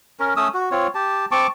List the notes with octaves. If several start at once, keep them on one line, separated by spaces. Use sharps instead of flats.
C#4 A#4
A3 C#4 D#6 E6
F#4
C4 F4 C#5
G4 A5
C4 A5 C#6 D6